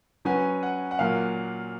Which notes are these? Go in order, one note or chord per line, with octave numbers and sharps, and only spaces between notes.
F#3 C#4 F#4 B4 G#5
F#5
F#5
A#2 F#3 A#3 F5